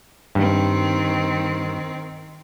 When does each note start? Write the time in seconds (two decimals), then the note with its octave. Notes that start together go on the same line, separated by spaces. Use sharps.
0.35 G2 D#3 C4